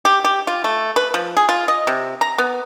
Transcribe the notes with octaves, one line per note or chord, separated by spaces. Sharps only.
G4
G4
F4
A3
B4
F3
G#4
F4
D#5
C3
A#5
B3